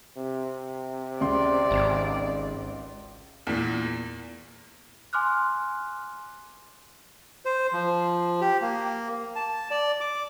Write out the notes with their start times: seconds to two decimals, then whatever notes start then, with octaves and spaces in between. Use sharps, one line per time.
0.17 C3
1.21 C#2 D5 C6
1.71 G#1
3.47 E2 A#2
5.13 G#5 C6 D6 F6 F#6
7.45 C5
7.73 F3
8.41 G4
8.61 A#3
9.36 A5
9.71 D5
10.01 D6